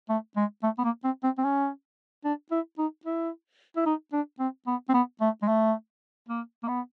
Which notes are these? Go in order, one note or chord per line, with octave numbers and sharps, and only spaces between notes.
A3
G#3
A3
B3
A#3
C4
C4
C4
C#4
D4
E4
D#4
E4
E4
D#4
D4
C4
B3
C4
B3
A3
G#3
A3
A#3
A#3
B3